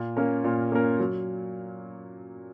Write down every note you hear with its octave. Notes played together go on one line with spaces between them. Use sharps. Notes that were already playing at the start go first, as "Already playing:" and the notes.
Already playing: A#2
A#3 C#4 A#4
A#2
A#3 C#4 A#4
F#3